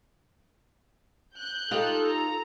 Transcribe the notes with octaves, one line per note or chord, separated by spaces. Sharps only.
F#6 G6
D#4 F4 G4 A4
A#5